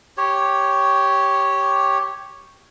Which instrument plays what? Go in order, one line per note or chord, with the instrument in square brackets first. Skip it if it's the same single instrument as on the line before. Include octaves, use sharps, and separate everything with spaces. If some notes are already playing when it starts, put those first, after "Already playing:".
[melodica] G4 C#5